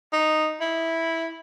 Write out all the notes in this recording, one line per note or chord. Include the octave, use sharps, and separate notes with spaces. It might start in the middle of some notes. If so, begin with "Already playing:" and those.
D#4
E4